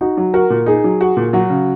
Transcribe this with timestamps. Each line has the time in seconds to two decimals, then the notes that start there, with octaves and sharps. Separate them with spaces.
0.01 D#4 F#4
0.17 F#3
0.34 F#4 A#4
0.50 A#2
0.66 D#4 G#4
0.84 F#3
1.01 F#4
1.17 A#2
1.33 F#3 F#4
1.50 C#3